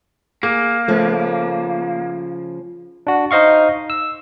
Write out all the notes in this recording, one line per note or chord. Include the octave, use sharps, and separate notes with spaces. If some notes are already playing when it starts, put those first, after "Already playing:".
A#3 G#4
C#3 F3 A3
D4 F#4
D#4 C5 D#5 F5 C#6
E6